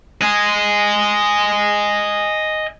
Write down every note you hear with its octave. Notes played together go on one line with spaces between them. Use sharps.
D#5 G#5